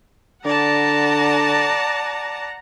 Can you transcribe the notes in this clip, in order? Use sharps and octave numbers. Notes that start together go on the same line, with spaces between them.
D3 D5 F#5 A5 A#5